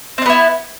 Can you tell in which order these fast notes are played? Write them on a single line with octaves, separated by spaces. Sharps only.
C4 D4 B3 E4